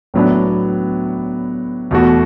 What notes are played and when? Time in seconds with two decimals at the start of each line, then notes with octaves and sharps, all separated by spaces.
0.14 A2 F#3 B3 D4
1.91 E2 B2 A3 F#4